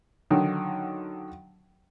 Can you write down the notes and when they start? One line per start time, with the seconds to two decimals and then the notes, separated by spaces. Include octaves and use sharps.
0.31 D3 D#3 F#3